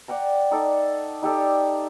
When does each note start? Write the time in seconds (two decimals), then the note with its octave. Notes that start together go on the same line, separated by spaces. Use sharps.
0.08 D5 F#5 G5 A#5
0.51 D#4 A4 D5
1.22 D#4 G4 A4 D5